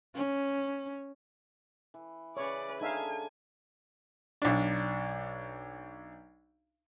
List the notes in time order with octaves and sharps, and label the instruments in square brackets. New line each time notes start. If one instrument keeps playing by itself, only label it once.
[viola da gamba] C#4
[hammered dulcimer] E3
[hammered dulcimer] C#3 E3 [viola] B4 D5 [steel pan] C#5
[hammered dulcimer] D3 [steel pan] D#4 E5 F5 [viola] G#5
[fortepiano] B1 D4